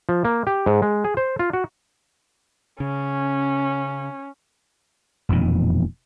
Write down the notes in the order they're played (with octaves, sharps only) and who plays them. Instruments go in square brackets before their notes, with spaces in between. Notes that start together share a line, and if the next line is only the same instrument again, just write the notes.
[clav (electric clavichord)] F3
A#3
G4
G#2
G#3
G#4
C5
F4
F#4
[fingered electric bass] C#3 [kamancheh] C#4
[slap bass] E1 F2 A#2 D#3